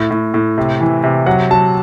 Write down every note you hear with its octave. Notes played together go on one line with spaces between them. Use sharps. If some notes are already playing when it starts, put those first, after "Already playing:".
Already playing: A2
A2
A2
C3
E3
C3
F#3 F#5
F#3 A5